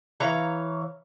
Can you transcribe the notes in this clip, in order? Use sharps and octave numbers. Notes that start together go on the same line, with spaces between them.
E3 C#5 F5 A#5